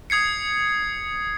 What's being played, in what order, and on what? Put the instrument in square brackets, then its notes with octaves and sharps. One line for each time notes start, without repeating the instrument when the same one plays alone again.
[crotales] D#6 G#6 C7 C#7